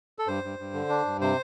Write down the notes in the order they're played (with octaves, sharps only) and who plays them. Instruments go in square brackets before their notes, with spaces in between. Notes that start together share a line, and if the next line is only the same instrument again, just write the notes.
[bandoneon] A4
G2 C5
G2
G2
D3
D4
G2
C3 C5